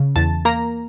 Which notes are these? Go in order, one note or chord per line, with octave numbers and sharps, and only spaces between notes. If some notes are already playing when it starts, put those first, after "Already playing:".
Already playing: C#3
E2 A5
A#3 A#5